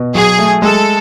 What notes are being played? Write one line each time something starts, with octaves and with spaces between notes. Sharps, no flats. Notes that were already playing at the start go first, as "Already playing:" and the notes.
Already playing: B2
F#3 G#4
A3
G#3 A4